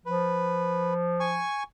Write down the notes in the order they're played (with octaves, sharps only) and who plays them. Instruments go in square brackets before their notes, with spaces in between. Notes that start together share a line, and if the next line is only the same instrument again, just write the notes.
[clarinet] F3 [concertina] B4
[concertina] G#5 C#6